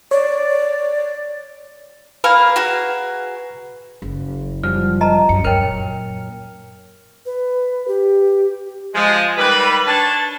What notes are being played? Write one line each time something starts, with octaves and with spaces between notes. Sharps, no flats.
C#5 D5
A#3 G#4 B4 F5 A#5 B5
F#4 G#4
F#1
F#2 F3 G3 F6
D#5 A5 A#5
F#2 C#7
F#2 A#2 A#4 C#5 G5 F6 C#7
B4
G4
F3 G#3
D#3 G3 B4
D4 C#5 A5